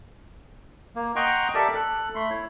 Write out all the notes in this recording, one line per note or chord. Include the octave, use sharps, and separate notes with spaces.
A#3
D#5 F#5 G5 A#5 C6 C#6
G4 A4 A#4 D5 E5 A5
A4 F#6
A3 B5 C6
E4 C#5